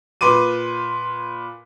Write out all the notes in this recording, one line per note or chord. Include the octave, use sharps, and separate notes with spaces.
A#2 B4 C6 D6 D#7